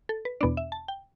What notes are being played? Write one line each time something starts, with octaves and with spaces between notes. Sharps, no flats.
A4
B4
E2 B2 B3 D4 D5
E5
A5
G5